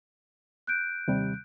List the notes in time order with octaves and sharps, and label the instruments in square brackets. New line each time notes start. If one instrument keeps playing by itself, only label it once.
[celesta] F#6 G6 D7
[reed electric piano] D#2 C3 G3